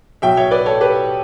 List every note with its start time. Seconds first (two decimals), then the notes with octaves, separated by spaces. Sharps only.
0.22 B1 B2 F#3 E5 G5
0.37 C#5 E5
0.51 B4 D5
0.66 A4 C#5
0.81 G4 B4